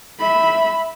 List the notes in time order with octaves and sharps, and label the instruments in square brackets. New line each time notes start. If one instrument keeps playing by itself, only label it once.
[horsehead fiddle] E5 B5